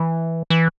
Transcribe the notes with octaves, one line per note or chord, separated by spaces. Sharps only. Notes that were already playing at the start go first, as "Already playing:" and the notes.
Already playing: E3
E3